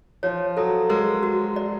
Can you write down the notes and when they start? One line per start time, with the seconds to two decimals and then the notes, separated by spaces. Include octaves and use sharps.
0.23 F3 C#5
0.57 F#3 A4
0.90 G#3 A#4
1.23 F#4
1.56 D5